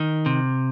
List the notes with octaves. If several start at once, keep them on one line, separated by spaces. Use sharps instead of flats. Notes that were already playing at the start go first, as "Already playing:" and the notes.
Already playing: D#3
C3